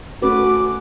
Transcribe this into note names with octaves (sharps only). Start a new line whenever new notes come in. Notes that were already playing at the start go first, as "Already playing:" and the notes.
A3 C#4 F#4 B4 D6